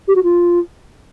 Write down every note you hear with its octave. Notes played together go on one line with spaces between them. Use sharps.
G4
F#4
F4